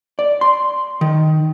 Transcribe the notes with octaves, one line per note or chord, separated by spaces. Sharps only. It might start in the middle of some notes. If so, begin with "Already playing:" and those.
D5
C6
D#3